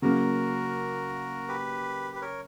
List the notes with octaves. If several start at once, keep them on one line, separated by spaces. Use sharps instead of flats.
C#3 F#3 A#3 F#4 A#4
G4 B4
B4
A#4 C#5